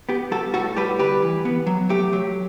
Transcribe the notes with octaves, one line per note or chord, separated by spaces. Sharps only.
B3 G4
G3 F#4 A4
A2 F#4 A4
G3 G4 B4
D2 G4 B4
E3
B3
F#3
A3 G4
F#3